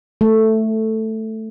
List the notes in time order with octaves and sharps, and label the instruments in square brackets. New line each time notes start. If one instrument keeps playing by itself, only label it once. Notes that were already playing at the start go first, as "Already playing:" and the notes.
[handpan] A3